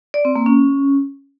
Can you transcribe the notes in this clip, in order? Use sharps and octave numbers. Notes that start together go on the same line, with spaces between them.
D5
C4
A#3
C#4